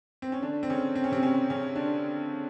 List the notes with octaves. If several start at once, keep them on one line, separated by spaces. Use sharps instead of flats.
C4
C#4
D3 D4
C4
C#3 C#4
C4
C#4
C3 C4
C#3 C#4
C#3 C#4
D3 D4